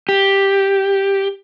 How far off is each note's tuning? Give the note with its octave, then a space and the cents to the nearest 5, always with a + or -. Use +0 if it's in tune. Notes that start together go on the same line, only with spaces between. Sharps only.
G4 +5